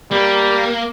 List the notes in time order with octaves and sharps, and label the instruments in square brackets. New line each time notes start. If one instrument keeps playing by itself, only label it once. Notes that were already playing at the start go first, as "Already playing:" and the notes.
[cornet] G3 [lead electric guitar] A#3